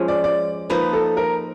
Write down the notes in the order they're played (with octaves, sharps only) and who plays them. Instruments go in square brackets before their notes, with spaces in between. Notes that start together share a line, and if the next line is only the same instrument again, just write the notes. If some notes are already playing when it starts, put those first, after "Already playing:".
Already playing: [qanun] F3 G#3 C#4
[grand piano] D5
D5
[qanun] F3 A#3 D#4 [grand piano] B4
[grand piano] A4
A#4